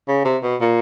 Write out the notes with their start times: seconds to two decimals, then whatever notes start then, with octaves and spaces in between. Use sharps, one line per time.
0.08 C#3
0.25 C3
0.43 B2
0.61 A#2